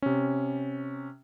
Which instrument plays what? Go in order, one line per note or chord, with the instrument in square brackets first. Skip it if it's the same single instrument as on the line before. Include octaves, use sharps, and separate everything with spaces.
[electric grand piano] C3 C#4